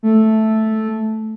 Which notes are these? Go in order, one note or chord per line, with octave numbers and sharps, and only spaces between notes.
A3